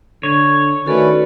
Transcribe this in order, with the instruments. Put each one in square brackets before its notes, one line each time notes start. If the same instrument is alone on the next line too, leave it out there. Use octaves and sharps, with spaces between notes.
[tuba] D3 [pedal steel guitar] C#5
[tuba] D#3 [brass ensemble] A3 C#4 B4 [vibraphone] F#4 A4 D5